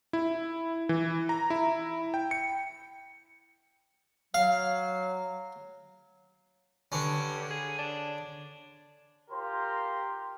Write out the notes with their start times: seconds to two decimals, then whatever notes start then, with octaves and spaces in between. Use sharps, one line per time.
0.13 E4
0.89 E3
1.29 A#5
1.50 E4
2.14 G5
2.31 C#7
4.34 F#3 F5
6.92 G2 D3 C#4
7.50 G#4
7.78 D4
9.30 F4 G4 A#4 C5 A#5 C6